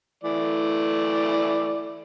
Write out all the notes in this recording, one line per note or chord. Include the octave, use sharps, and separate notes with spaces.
E3 A3 D5